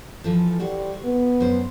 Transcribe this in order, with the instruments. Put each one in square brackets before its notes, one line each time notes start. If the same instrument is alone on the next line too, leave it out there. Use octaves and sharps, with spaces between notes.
[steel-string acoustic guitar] E3 F3 A4
[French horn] G3 [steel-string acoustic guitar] F#4 C5
[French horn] B3
[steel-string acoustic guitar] F#2 G#3 C5